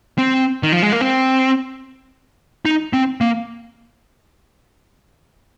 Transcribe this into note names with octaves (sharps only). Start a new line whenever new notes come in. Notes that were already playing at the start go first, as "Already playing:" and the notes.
C4
D#3
F3
G#3
A#3
C4
D#4
C4
A#3